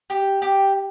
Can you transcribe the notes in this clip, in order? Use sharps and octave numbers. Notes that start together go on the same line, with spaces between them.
G4
G4